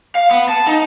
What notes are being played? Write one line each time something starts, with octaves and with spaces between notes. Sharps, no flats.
F5
B3
A5
D#4